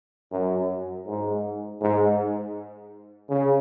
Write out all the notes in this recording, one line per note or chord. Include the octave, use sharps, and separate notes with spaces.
F#2
G#2
G#2
C#3